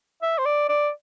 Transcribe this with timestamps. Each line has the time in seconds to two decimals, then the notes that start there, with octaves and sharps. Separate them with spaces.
0.22 E5
0.38 C5
0.45 D5
0.69 D5